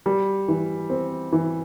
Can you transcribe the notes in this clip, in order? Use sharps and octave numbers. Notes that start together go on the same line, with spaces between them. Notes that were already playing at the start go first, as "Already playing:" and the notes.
G3
E3
C4
E3